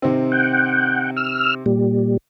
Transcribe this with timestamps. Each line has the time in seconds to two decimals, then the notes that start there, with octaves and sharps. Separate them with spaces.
0.02 C3 D#3 C4
0.32 F#5 G5
1.17 E6 F6
1.66 A#2 G3